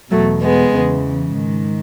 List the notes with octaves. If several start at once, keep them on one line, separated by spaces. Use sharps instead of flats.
E2 B2 F#3 A3
G#3 B3
E2 C#3 E3
G#2
D#3